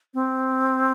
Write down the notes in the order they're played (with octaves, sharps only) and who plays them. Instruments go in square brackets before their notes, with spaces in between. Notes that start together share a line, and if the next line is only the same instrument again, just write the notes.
[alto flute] C4